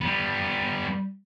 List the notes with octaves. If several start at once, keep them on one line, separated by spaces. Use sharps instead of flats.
G3 B3